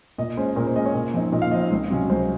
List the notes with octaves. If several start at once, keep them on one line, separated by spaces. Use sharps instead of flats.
A#2 D#5
G#3 C#4 C5
A#2 A#4
C5
G#3 C#4 D#5
C#5
A#2
F3 C4 D#4
A#2 D#5
F5
F3 C4 D#4 D#5
C#2
C3 F#3 C#4
C#2 C5